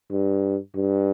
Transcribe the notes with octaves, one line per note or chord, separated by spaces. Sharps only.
G2
G2